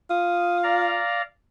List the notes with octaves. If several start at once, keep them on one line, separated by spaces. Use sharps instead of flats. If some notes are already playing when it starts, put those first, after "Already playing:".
F4 D#6
D5 F5 A#5